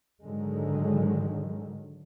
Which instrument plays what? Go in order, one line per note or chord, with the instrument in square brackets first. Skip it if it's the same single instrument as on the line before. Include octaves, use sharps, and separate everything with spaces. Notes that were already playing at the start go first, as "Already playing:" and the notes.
[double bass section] G#2 D3 D#3 F#3 G#3